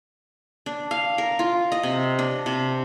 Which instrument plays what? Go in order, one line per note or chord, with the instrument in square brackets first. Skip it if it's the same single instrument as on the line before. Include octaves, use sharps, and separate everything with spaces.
[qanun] D4
F5
A#4
F4
D#5
C3
D4
C3